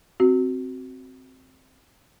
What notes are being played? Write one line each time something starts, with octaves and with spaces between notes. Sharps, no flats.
C4 F#4